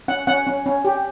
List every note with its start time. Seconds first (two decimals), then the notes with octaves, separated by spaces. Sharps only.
0.08 C#4 F#5
0.27 C#4 F#5
0.47 C#4
0.66 C#4
0.85 G4